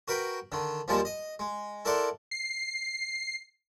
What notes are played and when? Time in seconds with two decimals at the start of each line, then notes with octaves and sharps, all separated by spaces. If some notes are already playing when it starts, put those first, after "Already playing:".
0.08 F#4 A#4 B4 G5 B5
0.52 D3 D#3
0.88 D#2 F3 G3 G#3 A#3 A5
1.05 D#5
1.39 G#3
1.85 E4 A4 A#4 D5 F#5 C6
2.31 C7